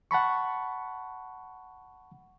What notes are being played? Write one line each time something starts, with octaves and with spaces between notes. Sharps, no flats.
F#5 A5 B5 C#6